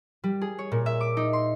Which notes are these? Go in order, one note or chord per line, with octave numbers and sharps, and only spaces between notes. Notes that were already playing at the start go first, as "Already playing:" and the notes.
G3
G#4
C#5
A#2
E5
D6
D#4
C6